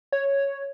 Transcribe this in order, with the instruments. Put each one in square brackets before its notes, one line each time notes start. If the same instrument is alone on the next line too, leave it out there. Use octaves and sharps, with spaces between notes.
[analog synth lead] C#5